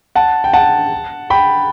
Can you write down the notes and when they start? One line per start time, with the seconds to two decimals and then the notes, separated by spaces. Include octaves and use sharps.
0.15 F#5 A5
0.44 G5
0.53 F#5 A5
1.30 G5 B5